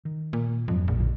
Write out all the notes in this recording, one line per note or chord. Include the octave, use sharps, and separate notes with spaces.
D#3
A#2
F2 G#2 F#3
A#1
F#2 A#2 D3